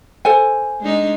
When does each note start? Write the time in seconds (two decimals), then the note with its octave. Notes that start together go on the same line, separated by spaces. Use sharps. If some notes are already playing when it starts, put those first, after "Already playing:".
0.25 A4 C5 G#5
0.81 G#3 D4 D#4